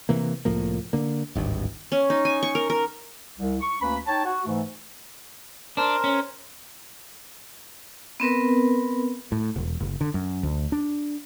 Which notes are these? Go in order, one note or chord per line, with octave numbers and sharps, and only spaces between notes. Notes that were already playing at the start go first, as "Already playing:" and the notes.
C3 E3 A#3
C2 A2 F3 A#3
D3 A#3
D1 G#1 G2
C#4
D#4
G#5
C#6
A#4
A#4
C2
C#6
D2 A#3 C#4 B4 B5
D#4 C#5 G5 A5
F#4
G#2 E3 A3
D4 A#4 C5
C#4
B3 C4 A#4 B4
A2
E1
F#1
D3
F#2
D2
D4